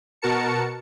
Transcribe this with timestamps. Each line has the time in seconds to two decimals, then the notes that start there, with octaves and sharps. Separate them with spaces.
0.22 B2 F#4 A#4 A5 C#7